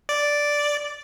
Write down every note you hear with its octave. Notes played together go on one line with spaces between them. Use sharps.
D5